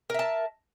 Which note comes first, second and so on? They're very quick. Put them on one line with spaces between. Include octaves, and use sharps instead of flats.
A#4 E5 A5